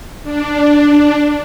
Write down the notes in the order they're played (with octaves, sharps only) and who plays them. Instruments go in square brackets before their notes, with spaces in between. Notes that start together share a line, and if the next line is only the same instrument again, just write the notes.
[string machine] D4